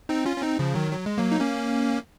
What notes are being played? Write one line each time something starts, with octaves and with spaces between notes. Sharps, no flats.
C4 D#4
C#4 F4
C#4
C4 D#4
C#3 F3
D#3 F#3
F#3
G#3
F#3 A#3
D#4
A#3 C#4